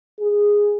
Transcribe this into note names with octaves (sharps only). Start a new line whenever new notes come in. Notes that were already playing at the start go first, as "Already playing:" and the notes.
G#4